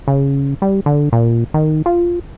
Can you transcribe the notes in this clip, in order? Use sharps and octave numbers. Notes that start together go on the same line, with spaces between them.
C#3
G3
D3
A#2
D#3
F4